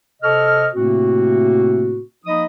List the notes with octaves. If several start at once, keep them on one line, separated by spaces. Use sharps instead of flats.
C3 A4 C5 D#5 C#6 F6
A2 C3 A3 A#3 C4 F#4
F3 A#3 D#4 D#5 B5 D#6